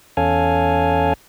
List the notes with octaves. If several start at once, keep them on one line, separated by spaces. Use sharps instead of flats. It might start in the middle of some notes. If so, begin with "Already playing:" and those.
E2 C#4 A4 F5 G#5